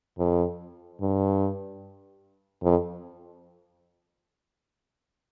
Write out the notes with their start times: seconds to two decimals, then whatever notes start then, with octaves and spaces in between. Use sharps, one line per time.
0.18 F2
1.01 G2
2.63 F2